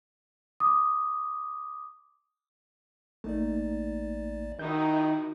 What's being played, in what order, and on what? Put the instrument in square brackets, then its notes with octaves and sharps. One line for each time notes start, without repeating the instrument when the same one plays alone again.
[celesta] D6 D#6
[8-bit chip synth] A1 D5 [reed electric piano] A3 A#3 D#4
[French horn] D#3 [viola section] D#4 E4 F#4 [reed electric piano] G6